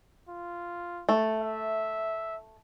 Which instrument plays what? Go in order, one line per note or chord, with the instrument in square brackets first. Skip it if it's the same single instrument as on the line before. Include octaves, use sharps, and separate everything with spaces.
[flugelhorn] F4
[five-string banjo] A3
[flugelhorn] E5